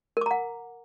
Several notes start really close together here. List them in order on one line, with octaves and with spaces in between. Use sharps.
A#4 D6 A#5 F#5